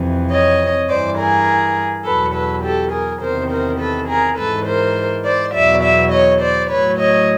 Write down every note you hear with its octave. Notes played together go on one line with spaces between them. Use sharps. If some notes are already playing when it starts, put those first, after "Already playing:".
Already playing: F2 C3 E3
C#5 D#5
G2 E3 C5 D5
G#4 A#4
E2 B2 F#3 A4 B4
A4 B4
G4 A4
G#4 A#4
E2 C3 D#3 A#4 C5
A#4 C5
A4 B4
G#4 A#4
G#2 E3 A4 B4
A#4 C5
C5 D5
E2 B2 F#3 D5 E5
D5 E5
C#5 D#5
C5 D5
A2 F#3 B4 C#5
C#5 D#5